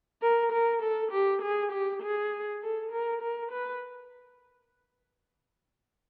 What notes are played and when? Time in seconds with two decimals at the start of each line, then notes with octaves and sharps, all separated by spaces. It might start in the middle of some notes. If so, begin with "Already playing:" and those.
0.22 A#4
0.52 A#4
0.82 A4
1.12 G4
1.42 G#4
1.72 G4
2.02 G#4
2.62 A4
2.92 A#4
3.22 A#4
3.52 B4